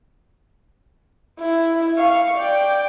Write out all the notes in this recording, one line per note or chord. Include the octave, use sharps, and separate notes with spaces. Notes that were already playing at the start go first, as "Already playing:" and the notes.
E4
F5 C#6
D5 G5